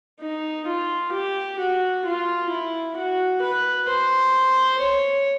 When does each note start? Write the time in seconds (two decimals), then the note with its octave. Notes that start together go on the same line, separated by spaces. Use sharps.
0.20 D#4
0.66 F4
1.12 G4
1.59 F#4
2.05 F4
2.50 E4
2.97 F#4
3.42 B4
3.88 C5
4.80 C#5